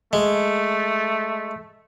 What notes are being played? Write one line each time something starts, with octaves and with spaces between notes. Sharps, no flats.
G#3 A3